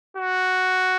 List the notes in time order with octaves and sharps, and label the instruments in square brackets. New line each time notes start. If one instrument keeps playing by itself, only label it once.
[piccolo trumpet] F#4